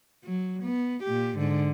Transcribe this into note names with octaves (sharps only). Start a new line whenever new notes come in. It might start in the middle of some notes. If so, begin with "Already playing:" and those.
F#3
B3
A#2 G4
G#2 D3